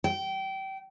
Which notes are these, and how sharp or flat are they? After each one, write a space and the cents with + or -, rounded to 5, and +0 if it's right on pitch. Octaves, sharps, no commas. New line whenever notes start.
G5 -25